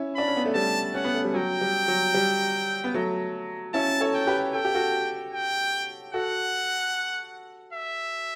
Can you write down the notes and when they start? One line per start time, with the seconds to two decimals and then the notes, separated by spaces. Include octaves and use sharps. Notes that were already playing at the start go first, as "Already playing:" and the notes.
Already playing: C#4 E4
0.15 D4 B5
0.27 C#4
0.37 B3
0.46 A3
0.54 G3 A5
0.94 C#4 F#5
1.04 B3
1.15 A3
1.25 G3
1.34 F#3 G5
1.61 G3
1.88 F#3
2.14 G3
2.84 B3
2.94 F#3 A3
3.74 C#4 E4 A5
4.00 A4 C#5
4.14 G5
4.27 G4 B4
4.54 A4 G5
4.65 G4
4.75 F#4 A4
5.33 G5
6.14 F#4 A4 F#5
7.73 E5